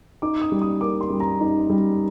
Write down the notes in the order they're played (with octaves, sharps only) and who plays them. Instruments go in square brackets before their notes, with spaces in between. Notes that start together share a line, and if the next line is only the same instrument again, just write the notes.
[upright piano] D#4 D6
D#6
G3
D#6
A#3 D6
C6
G3
A#5
D#4
G3